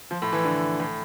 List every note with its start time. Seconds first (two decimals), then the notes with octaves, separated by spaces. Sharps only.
0.11 F3
0.22 A2
0.33 E3
0.45 D3
0.80 A2